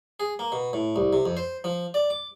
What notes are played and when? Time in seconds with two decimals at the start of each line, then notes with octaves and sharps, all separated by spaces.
0.20 G#4
0.39 A#3
0.52 B2
0.73 A2
0.96 C2
1.13 C3
1.26 F2
1.37 C5
1.64 F3
1.94 D5
2.10 D6